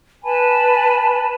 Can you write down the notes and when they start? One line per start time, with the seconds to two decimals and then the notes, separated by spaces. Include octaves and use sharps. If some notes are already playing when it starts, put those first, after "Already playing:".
0.24 B4 G#5 A5 B5